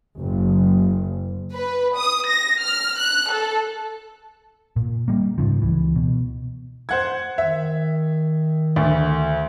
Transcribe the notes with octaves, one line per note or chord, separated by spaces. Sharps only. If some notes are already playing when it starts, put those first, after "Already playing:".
F#1
B4
D#6
A#6
F6
F#6
A4
A#2
G3 A#3
G#2 C#3 F3
C#2 E3
B2
C5 F#5 G#6
D#3 E5
D2